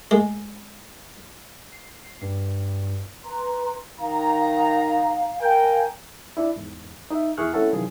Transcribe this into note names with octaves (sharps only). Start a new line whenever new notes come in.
G#3
C7
G2
B4 A#5 C6
D#3 F5 A#5
A#4 F5 G5 G#5
D4 E4
E2 G#2
D#4 E5
E2 E4 G#4 C#6 F6 F#6
A3 C4 C#4 E4 A4 F#5
C3 D#3 E3 F#3 F4 G#4